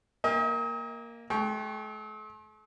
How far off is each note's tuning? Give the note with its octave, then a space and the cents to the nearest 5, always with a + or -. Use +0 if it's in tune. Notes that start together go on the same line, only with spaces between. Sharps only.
A#3 +0 D#5 +40 G5 +40
A3 -45 G5 +0 C#6 +0